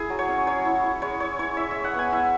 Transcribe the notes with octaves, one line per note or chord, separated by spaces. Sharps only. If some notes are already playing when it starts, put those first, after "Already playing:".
Already playing: E4 G#4
F#3
C#5
C#4
F#3 C#5
E4
E4
G#3 C#5
E4 C#5
E4 C#5
E4 E5
G#3 E5
F#5
B3 G#5
E4 E5